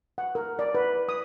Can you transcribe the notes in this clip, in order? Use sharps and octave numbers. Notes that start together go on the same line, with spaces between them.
F#5
A#4
D5
B4
D#6